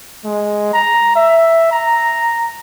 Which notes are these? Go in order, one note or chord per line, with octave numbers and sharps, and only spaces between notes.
G#3
A#5
E5
A#5